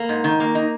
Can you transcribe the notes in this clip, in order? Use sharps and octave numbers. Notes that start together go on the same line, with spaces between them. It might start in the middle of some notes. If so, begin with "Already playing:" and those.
Already playing: A#3
G#2
D#3
A#3
D#4